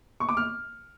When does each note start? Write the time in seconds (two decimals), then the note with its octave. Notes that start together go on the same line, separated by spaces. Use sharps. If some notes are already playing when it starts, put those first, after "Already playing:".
0.20 C#6
0.29 D6
0.37 F6